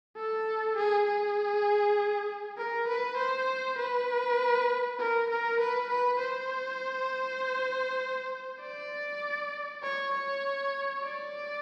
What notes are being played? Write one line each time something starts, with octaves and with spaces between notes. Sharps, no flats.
A4
G#4
G#4
A#4
B4
C5
B4
A#4
A#4
B4
B4
C5
D5
C#5
C#5
D5